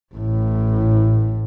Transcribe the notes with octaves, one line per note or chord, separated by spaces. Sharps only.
A1 A2